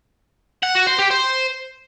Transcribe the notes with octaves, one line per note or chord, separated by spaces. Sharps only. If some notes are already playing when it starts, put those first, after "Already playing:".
F#5
F#4
C5
G4
C5